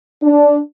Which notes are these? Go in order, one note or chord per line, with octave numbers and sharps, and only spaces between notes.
D4